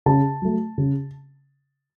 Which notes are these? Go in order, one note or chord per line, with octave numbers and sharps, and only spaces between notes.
C#3 A5
F#3 A3
C#3